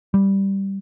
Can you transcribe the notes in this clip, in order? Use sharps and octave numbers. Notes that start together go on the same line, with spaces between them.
G3